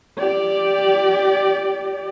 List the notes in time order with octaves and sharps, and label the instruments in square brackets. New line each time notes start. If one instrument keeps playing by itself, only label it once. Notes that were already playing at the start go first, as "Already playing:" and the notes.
[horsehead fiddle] G4 D5